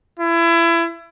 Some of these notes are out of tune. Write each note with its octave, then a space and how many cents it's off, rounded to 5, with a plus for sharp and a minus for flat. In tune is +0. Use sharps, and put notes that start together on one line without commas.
E4 +30